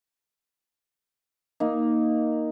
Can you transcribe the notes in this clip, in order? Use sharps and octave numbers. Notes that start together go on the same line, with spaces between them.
A#3 D#4